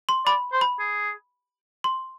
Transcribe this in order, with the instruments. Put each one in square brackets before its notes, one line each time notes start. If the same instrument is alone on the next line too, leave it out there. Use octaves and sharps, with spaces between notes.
[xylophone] C6
[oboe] D5 [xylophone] B5
[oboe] C5
[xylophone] B5
[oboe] G#4
[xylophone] C6